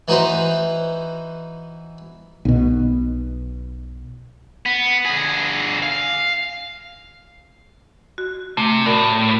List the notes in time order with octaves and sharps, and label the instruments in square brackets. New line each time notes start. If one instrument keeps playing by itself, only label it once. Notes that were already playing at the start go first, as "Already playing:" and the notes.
[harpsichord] E3 D#4 F#4 B4 C5
[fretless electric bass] B1 B2
[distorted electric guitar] B3
D3 G#4
F5
[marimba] F#4
[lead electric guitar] C3 [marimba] A3
[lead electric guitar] A2 [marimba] F#4 A#4 D5